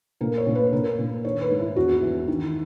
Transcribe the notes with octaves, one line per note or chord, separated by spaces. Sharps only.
A#2 A#4
C#5
A#2
B4
A#2 A#4
A#2
D#3 C#5
B4
G#2
E4
E2 F#4
E3
D#3